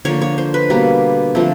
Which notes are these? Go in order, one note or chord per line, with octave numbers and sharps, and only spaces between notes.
D3 F3 A#3 C#5
C#5
C5
B4
B2 G3 A#3
D3 F3 A3 C4